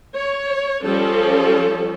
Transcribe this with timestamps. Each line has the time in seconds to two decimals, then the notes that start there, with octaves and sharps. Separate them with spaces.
0.15 C#5
0.84 F3 G3 C#4 A4